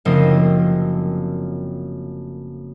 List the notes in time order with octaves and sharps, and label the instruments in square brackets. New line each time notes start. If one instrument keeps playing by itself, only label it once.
[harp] F#1 F3 A3 C4 D#5 D#6